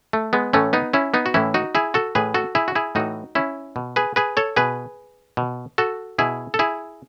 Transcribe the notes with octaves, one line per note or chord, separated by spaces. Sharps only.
A3
G#3 B3
A2 E3 A3 C#4
B3 D#4
C#4 E4
B3 D#4
F#4
A2 E3 C#4 E4
D#4 F#4
E4 G#4
F#4 A4
A2 E3 G#4 B4
F#4 A4
E4 G#4
F#4
E4 G#4
A2 E3 D#4 F#4
C#4 E4
B2
G#4 B4
G#4 B4
A4 C#5
B2 G#4 B4
B2
F#4 A4
B2 E4 G#4
A4
E4 G#4